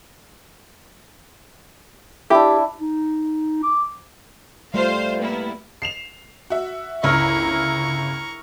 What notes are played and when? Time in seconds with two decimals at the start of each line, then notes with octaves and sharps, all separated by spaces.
2.30 D4 E4 G4
2.80 D#4
3.63 D6
4.74 G3 A3 F4 C5 F5
5.19 A#3 B3 E4
5.82 C7 E7 F7
6.50 F#4 E5
7.03 G1 C#2 E4 A#4 E5 A#5 C#6